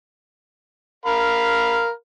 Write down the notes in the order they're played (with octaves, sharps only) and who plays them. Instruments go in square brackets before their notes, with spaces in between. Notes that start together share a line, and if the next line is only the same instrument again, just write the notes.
[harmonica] A#4 F5 B5